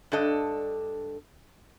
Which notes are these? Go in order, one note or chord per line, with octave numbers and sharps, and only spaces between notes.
G2 D4 A4 D#5